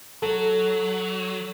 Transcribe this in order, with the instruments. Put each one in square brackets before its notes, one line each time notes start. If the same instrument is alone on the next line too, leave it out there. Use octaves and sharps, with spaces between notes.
[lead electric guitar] F#3 [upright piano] A4